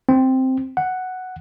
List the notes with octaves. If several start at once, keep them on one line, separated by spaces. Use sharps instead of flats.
C4
F#5